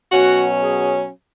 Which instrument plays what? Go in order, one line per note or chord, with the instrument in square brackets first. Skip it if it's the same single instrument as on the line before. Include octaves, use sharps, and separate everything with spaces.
[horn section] B2 F#3 C#4 F#4
G#4